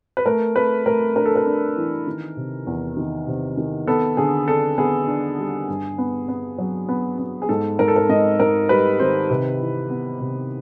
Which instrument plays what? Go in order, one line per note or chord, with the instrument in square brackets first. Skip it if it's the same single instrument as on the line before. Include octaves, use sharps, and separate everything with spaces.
[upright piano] B4
A3 A#4
A3 B4
A3 A#4
D4 A#4
A4
A#4
D4
E3
D#3
C3
E2
D#3
C3
D#3
B3 A4
D3 G#4
D4 A4
B3 G#4
D4
G3
G2
B3
B3
F#3
B3
B3
G#4
G#2 A4
G#2 A#4
A4
A#4
G#2 D#5
G#2 A#4
G3 B4
D#3 C5
C3 B4
E3
B3
C3